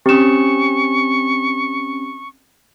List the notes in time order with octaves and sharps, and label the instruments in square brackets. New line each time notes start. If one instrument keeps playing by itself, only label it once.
[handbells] C4 C#4 [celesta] G4 E7 [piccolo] C#6